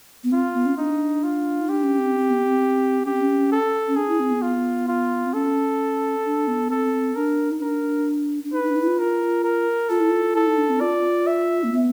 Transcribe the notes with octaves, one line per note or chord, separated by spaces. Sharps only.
B3
C4 F4
B3
C#4
D4 D#4
F4
D#4
D4 G4
C#4
C4
C4
B3
C4
C#4 G4
C4
C#4
A4
C#4
D4 G#4
E4
C4
B3
F4
F4
C4
C#4 A4
D4
B3
C4 A4
D4 A#4
D#4
D4 A#4
D4
D#4 B4
D#4
D4
D#4
E4
F4
A#4
A#4
F4 A4
E4
F4
E4 A4
D#4
D4
C4
F4 D5
E5
A#3
B3